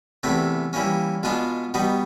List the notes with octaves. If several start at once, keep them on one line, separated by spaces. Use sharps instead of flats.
E2 C3 E3 A3 C4
E3 G3 A#3 C#4
B2 G#3 B3 D4 F4
B2 G3 B3 D#4